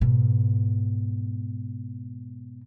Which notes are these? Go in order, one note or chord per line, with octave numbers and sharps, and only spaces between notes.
G#2 B2